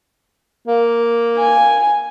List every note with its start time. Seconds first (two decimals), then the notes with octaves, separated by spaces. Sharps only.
0.68 A#3
1.38 G#5